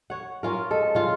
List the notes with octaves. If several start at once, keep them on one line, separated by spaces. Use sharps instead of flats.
C#5 F#5
C#4 F4 A#4
G#3 A4
C#3 F4